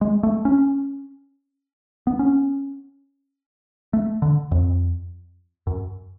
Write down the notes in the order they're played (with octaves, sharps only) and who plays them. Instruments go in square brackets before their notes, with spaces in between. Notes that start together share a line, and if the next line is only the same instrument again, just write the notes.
[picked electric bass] G#3
A3
C#4
B3
C#4
A3
D3
F2
F#2